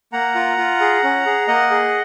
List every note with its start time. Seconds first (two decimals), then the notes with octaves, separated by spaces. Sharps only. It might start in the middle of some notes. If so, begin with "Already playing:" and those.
0.13 A#3 F#5 A#5
0.35 F4
0.58 F4
0.80 G#4
1.04 C#4
1.26 G#4
1.48 A#3 D#5 F#5
1.71 G#4